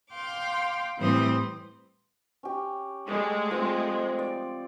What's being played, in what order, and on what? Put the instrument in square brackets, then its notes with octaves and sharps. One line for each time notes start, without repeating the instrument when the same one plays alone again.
[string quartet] F5 G5 C6 D6
A2 E3 G3 C4 C5 D#6
[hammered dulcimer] C#4 G4
[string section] G#3 A3 [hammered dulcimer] D5
[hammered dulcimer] F3 C4
D5